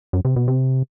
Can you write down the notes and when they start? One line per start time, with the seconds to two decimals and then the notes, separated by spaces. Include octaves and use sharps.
0.13 F#2
0.25 C3
0.36 B2
0.48 C3